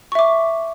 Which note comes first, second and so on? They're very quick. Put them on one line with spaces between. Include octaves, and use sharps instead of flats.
C#6 E5 D6